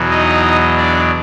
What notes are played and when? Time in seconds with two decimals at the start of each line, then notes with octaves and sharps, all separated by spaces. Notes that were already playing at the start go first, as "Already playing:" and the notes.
Already playing: E2 B2 F#3
0.10 D#4 D#5
0.77 D4 D5